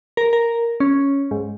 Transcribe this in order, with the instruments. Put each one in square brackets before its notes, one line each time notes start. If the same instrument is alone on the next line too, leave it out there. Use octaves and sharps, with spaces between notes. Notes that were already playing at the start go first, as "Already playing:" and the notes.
[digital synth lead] A#4
A#4
C#4
G#2